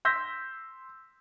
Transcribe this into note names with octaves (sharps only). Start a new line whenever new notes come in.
C6 E6 G6 A#6 B6